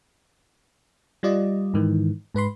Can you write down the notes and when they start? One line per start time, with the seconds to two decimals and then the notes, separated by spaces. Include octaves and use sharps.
1.23 G3 F4 D5 D#5
1.74 G#2 D#3 E3
2.34 G#2 B4 B5 C6